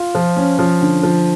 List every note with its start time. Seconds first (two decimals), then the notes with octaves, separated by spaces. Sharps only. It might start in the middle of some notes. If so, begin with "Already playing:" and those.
Already playing: F4
0.15 F3
0.37 C#4
0.59 F3
0.81 D3
1.03 F3